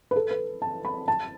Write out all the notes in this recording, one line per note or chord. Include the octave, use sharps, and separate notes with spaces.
B4
A4
B4
A5
B5
A5